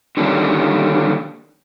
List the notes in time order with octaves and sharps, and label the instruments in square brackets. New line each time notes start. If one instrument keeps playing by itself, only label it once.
[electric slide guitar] D3 D#3 G3 A#3 C#4 D4